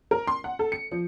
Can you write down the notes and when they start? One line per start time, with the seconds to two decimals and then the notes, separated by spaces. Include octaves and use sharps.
0.11 A#4
0.27 C6
0.44 F#5
0.59 A4
0.72 C#7
0.92 F3